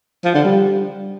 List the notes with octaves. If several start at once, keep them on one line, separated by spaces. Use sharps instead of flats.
F3
D3
G3